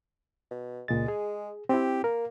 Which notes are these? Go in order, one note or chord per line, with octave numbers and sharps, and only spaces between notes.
B2
C#2 A#2 G#3 A6
G#4
C4 E4 G4
A#3 A#4